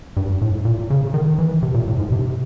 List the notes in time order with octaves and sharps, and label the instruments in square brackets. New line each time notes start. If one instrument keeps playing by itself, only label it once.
[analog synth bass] G2
A2
A#2
C#3
D#3
E3
C3
A#2
A2
G#2
C3